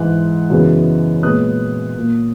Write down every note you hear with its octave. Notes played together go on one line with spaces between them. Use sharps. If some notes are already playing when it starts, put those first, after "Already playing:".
Already playing: G#2 E3 G#3 F#6
F#2 C#3 E3 G#3 B3
A#2 G#3 B3 D#6 F#6
A#2 A#3